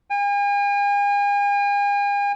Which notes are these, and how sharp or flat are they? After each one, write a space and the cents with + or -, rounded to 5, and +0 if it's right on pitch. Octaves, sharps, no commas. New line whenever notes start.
G#5 -45